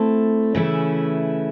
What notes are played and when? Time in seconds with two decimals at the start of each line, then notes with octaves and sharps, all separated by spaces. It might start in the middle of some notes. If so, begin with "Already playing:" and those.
Already playing: A3 C4 E4 A4
0.55 C#3 E3 A3 C#4 E4